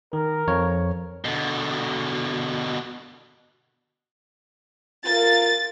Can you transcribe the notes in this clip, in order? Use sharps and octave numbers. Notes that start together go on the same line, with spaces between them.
D#3 A#4
F2 C#5
B2 D3
F4 A#4 A6